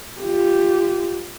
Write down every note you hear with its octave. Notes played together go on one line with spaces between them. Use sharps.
F4 G4